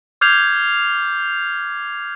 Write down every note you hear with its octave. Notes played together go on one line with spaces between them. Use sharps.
D6 F6 G6 G#6 C7 F7